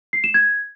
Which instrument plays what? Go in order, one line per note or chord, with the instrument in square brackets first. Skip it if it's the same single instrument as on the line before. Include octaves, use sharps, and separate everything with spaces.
[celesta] C7
E7
G#6